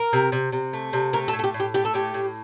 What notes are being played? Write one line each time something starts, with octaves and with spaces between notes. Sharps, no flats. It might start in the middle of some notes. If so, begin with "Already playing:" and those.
Already playing: A#4
C3
C3
C3
A3
C3
A3 A#4
A4
A2
A4
G4
A2
G4
A3 G4
A4
A2 G4
A2